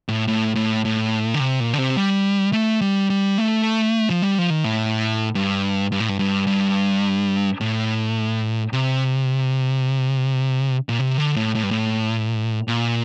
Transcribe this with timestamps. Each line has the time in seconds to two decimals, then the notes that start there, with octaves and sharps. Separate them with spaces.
0.08 A2
0.28 A2
0.55 A2
0.85 A2
1.34 D3
1.40 C3
1.60 A#2
1.73 D3
1.78 C3
1.97 G3
2.53 A3
2.81 G3
3.10 G3
3.38 A3
4.10 F3
4.22 G3
4.38 F3
4.50 D#3
4.64 A2
5.35 G2
5.92 G2
6.00 A2
6.09 G2
6.19 G2
6.47 G2
7.61 A2
8.73 C3
10.89 A#2
10.99 C3
11.18 D3
11.36 A2
11.55 A2
11.63 G2
11.71 A2
12.68 A#2